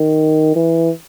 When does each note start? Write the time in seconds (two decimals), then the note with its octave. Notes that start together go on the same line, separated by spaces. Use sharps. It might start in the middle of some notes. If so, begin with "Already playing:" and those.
Already playing: D#3
0.56 E3